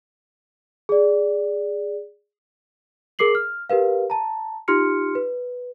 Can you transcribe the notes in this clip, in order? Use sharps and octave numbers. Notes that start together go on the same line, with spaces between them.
G#4 D5
G#4 A#4 D6 C7 F#7
F6
G4 A#4 B4 F5
A5 A#5
D#4 F4 G4 C6 F6 C#7
B4